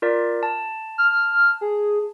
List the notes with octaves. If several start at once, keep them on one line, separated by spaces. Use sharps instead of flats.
F4 A#4 D5
A5
F6
G#4